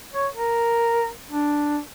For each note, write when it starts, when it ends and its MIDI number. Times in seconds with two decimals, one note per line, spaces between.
0.13 0.26 73
0.34 1.08 70
1.31 1.79 62